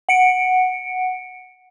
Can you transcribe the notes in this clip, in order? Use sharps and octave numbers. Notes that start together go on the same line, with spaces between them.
F#5 C#7 D7